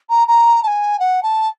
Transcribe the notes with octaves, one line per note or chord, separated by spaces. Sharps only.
A#5
A#5
A5
G#5
F#5
A5